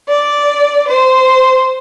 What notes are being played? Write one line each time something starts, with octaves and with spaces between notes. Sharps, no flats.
D5
C5